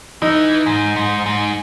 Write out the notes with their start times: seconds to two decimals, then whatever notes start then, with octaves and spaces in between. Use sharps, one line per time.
0.22 E3 D#4
0.66 G#2
0.96 G#2
1.26 G#2